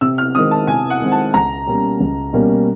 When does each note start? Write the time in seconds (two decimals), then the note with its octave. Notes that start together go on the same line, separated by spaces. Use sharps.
0.01 C3 E6
0.18 F6
0.35 D#3 G#3 C4 D#6
0.51 A5
0.67 C3 G#5
0.90 F#5
1.01 D#3 G#3 C4
1.12 A5
1.34 C#2 A#5
1.67 B2 G3 A#3 C#4
2.00 C#2
2.33 B2 G3 A#3 C#4